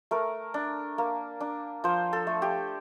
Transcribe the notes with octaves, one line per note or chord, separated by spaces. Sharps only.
A3 A#4
D4
A#3
D4
F3 C5
A4
A3
G4